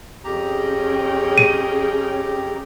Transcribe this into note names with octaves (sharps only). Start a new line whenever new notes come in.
F2 C#4 G4 G#4 G5 A#5
D#7